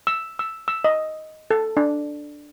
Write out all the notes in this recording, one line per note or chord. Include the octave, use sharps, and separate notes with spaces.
E6
E6
E6
D#5
A4
D4